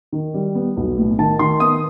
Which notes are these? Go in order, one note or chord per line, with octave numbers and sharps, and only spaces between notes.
D#3
G3
B3
B1
A2
D#3 A5
D#3 C6
B3 D#6